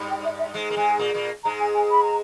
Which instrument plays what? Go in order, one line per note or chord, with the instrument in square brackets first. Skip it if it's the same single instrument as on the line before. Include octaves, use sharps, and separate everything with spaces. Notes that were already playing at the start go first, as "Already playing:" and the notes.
Already playing: [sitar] G2 G3
[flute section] G5
E5
E5
[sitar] G#2 G#3
A#3
[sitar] G#2 G#3 [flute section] G#5
[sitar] A#2 A#3
A#2 A#3
[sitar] G#2 G#3 [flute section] A#5
[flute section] G#5
G#5
B5
A#5